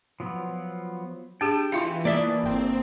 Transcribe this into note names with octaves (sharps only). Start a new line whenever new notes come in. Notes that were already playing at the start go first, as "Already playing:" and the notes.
F3 F#3 B3
D4 G4 G#4 G5
E3 E4 F4 F5
A#3 D5 E5 A5 D#6
G1 C4